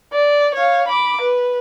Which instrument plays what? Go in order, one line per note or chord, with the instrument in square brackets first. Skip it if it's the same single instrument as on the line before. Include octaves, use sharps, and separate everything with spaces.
[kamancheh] D5
C#5 F5
B5 D6
B4